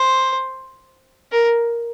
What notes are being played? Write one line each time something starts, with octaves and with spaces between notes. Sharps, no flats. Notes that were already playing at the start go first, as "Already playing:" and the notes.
Already playing: C5
A#4